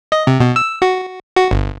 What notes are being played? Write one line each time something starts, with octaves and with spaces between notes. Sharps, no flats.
D#5
C3
B2
E6
F#4
F#4
G1